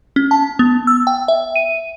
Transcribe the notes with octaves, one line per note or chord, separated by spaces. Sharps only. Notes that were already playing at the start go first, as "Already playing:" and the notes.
C#4
A5
B3
E6
G5
E5
D#7